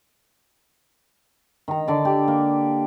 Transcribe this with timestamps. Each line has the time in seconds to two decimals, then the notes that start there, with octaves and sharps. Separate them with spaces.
1.68 D#3 A#5
1.88 D3 D5
2.05 G4
2.28 A#3